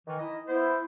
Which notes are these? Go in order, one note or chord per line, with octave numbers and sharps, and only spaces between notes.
D#3 E3
D#4 E4 D#5
B3 E4 C5